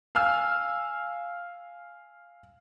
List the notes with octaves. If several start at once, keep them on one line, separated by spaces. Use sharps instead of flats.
F5 G#5 E6 F6